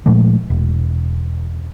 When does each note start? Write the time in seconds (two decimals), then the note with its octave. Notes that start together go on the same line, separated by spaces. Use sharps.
0.06 A#2 F3 G#3 A3
0.50 E1